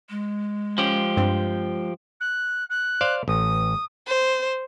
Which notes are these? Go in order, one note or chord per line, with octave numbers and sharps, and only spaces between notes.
G#3
F3 C#4 G4
G2 C4
F#6
F#6
C5 D5 F5
A1 D#6
C5